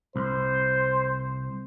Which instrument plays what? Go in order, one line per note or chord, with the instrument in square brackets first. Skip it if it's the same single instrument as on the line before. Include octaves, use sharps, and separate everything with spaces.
[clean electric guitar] C2 [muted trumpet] C5